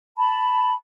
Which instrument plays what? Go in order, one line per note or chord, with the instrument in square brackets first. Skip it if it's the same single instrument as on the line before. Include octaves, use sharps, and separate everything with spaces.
[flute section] A5 B5